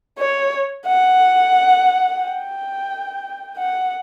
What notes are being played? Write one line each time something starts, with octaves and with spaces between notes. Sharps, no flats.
C#5
F#5
G5
F#5